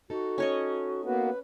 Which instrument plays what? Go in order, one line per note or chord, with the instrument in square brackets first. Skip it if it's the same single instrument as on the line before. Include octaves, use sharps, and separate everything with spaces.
[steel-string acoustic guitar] D#4 A4 [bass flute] F#4
[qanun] C#4 C#5 D#5
[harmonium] A#3 B3 F#4 [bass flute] B4